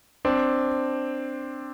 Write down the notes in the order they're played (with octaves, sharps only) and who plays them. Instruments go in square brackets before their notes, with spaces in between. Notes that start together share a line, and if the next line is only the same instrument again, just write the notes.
[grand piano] C4 D4